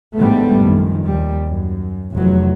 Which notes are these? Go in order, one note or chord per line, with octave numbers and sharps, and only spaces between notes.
A1 G#2 D3 G3 A3 B3
A#1 F#2 D#3
D#2 G3
F#2
F1 E2 F#3